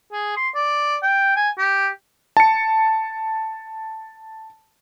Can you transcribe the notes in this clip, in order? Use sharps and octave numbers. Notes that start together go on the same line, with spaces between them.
G#4
C6
D5
G5
G#5
G4
A5 C#7